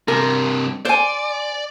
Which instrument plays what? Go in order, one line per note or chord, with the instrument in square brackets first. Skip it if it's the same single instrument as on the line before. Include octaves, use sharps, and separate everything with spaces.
[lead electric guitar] G2 C3 [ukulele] A#4
[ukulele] C5 G#5 [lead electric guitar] D5